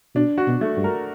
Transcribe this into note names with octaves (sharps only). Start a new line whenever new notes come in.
B2 D4
F#4
B2
A3
G2
A#4